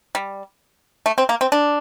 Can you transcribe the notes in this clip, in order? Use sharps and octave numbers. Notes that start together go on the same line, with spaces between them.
G3
A3
C4
A#3
C4
D4